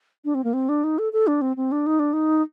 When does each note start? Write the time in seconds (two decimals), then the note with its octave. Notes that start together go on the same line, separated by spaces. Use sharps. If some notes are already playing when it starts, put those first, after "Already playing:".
0.25 D4
0.35 C4
0.44 A#3
0.53 C4
0.69 D4
0.84 D#4
0.98 A4
1.13 A4
1.27 D4
1.41 C4
1.57 C4
1.72 D4
1.86 D#4
1.99 D4
2.13 D#4